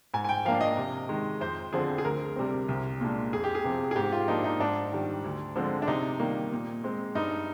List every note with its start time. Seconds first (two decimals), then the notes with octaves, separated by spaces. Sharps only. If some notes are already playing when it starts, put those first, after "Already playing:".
0.14 G#2 G#5
0.25 G#5
0.29 G5
0.45 F3 A#3 D4 F5
0.61 D#5
0.77 C3
1.09 D#3 G#3
1.40 F2 C5
1.73 D3 F3 C4 G#4
1.98 G#4
2.05 D2 A#4
2.36 C3 G3 C4
2.68 C2
3.00 A#2 G#3 D4
3.33 F2 G#4
3.44 G4
3.55 G#4
3.65 C3 F3 C4
3.91 G#4
3.96 G#2 G4
4.12 F4
4.28 F3 A#3 D4 D#4
4.44 D#4
4.60 G#2 D4
4.92 D#3 G3
5.24 D2
5.56 D3 F3 G#3 C4
5.82 D4
5.87 C3 D#4
6.20 D#3 G3 A#3
6.52 A#2
6.84 G#3 C4
7.15 G2 D#4